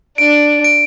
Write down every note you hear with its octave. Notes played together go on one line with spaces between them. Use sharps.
D4 D7
D7